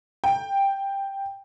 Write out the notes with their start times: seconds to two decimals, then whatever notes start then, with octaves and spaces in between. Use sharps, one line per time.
0.24 G5